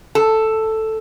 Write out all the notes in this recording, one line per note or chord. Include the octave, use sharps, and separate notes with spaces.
A4